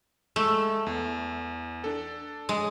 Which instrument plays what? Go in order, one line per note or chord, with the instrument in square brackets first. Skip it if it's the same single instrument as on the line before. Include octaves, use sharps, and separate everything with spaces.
[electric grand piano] G#3 [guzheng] A3
[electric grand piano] E2
D4 A4
[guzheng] G#3